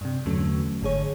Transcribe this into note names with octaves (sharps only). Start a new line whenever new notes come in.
G2 C3
E2 D3 F#3 A3 C#4
G1 G#2 D3 G#4 C#5